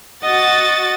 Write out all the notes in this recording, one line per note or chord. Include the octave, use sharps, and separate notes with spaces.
F#4 D#5 A6